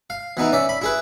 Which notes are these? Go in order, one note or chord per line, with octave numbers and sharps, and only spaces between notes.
F5
E3 B3 D#4 E4
C#4 D5 E5
B5
E4 G#4 B4